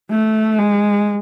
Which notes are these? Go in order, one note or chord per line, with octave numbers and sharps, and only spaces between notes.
A3
G#3